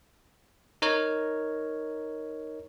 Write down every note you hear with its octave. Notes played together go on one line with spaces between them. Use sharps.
D#4 A#4 C#5